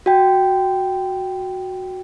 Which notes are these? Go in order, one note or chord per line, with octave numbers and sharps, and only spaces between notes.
F#4 G5